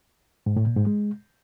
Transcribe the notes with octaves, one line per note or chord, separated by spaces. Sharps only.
G#2
A2
A#2
G#2
G#3